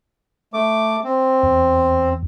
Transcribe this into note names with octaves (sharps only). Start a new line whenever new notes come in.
A3 D6
C4
E2